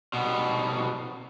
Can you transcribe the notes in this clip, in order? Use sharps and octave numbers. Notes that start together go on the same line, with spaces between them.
C2 B2